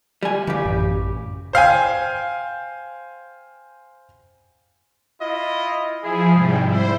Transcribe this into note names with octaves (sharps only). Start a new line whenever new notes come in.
G3 G#5
C#3 E3 G4
A1 F#2
C5 F5 G5 G#5
E4 F4 D#5
F3 E4 G#4
G#2 C3 G3
E4 C5